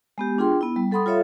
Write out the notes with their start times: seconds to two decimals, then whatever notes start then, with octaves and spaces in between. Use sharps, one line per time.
0.18 G#3 B3 G4
0.38 D4 F4 G#4 G5 C6
0.61 B3 E4
0.76 G3
0.91 G3 A4 F#5 B5 C6 D#6
1.06 F4 A4 C#5 E5 F5